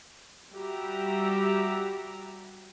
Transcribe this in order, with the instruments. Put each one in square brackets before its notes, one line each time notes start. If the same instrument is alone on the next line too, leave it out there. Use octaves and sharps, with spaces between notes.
[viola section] G3 F#4 G4 E5 A#5